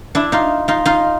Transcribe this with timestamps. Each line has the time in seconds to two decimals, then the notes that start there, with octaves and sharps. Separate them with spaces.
0.15 D4 E4
0.32 D#4 F4
0.68 D#4 F4
0.85 D#4 F4